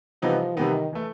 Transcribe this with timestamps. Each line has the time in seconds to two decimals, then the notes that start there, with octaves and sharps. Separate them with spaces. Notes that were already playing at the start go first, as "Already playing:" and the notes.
0.22 C3 E3 F3 G3 B3 D#4
0.56 C3 D#3 E3 G3 B3 D#4
0.93 E3 A3